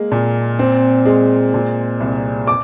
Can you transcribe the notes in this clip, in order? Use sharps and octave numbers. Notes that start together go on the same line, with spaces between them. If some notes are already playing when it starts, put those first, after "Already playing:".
Already playing: G#3 A#3
A#2
C4
G#3
A#2
C2
D6